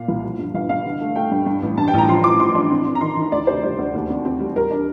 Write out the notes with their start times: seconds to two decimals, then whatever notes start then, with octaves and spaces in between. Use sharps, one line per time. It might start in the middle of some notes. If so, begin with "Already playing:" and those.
Already playing: A#2 F5
0.08 C2
0.24 F3
0.39 G2
0.54 G1 F5
0.69 G2 F5
0.85 D3
1.00 A3
1.16 A3 G5
1.31 G2
1.46 G2
1.62 A1
1.77 G2 A5
1.88 G5
1.94 A1 A#5
2.08 F3 C6
2.24 F3 D6
2.40 F3 C6
2.55 D4
2.71 C4
2.86 C4
2.95 A#5
3.01 D#3 C6
3.17 D#3
3.22 C6
3.32 D2 D5
3.47 C3 C5
3.64 G3 D5
3.78 D2
3.94 D#2
4.09 C4
4.25 C4
4.40 G3
4.56 G3 A#4
4.71 D4